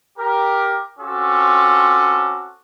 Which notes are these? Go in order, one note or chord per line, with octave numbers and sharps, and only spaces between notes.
G4 A#4
C4 C#4 F4 F#4 A4 D6